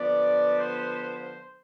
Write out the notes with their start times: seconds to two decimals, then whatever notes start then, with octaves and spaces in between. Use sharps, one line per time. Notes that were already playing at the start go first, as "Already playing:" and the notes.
Already playing: D3 F3 B3 D5
0.59 C5